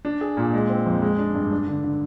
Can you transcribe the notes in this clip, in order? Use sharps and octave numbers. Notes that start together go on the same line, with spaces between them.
D4
G#4
A#2
G#3
C4
F2
G#3
D4
G2
D4
D3
D3